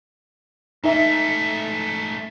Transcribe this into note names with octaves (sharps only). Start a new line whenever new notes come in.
G#2 A3 D#4 E5